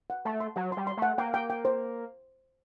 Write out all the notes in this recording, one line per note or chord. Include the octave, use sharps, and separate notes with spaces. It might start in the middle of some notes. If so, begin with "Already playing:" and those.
F#5
A3 A5
C6
F#3 F#5
G3 C6
C6
A3
F#5
A#3 G5
G5
G5
C5